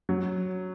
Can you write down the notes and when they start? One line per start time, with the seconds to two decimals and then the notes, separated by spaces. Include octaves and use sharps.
0.09 F#3